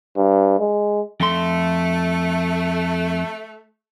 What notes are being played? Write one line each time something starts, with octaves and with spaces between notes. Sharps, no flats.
G2
G#3
F2 A3 C6